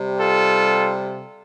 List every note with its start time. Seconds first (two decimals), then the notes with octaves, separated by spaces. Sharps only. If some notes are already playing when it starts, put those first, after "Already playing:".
Already playing: C3 G3
0.20 F4 A4